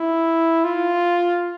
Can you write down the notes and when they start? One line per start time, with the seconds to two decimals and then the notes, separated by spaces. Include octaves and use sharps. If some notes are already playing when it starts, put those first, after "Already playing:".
Already playing: E4
0.64 F4